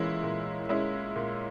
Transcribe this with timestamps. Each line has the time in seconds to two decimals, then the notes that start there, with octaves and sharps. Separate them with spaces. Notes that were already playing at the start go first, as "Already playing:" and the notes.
Already playing: A#2 E3 G#3 C#4 E4
0.23 A#2
0.69 G#3 C#4 E4
1.16 A#2